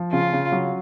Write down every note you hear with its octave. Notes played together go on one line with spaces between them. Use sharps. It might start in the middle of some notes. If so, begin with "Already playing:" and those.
Already playing: F3
C#3 F4
C#3
F#3